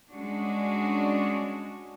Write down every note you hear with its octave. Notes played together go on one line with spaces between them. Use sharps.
G#3 C#4 D4 F#4